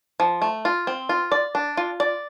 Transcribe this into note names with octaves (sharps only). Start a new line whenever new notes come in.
F3
A3
F4
C4
F4
D5
D4
F4
D5